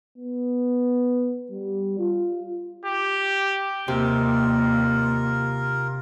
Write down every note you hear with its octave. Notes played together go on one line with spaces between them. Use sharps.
B3
G3
F4
G4
D#2 C3 F4 A#4